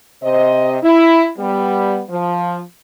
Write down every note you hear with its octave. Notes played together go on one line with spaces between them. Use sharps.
C3 C5 D#5
E4
G3 B3
F3